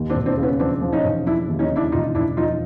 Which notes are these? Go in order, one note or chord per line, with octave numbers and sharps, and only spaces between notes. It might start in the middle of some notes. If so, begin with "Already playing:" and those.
Already playing: D#2
C4 D4
E1
C4 D4
C#3
B3 C#4
F3 C4 D4
F3
C#4 D#4
E1
F3 D4 E4
D#2
C#4 D#4
C#3
D4 E4
E1 D#4 F4
E1 D4 E4
F3 D#4 F4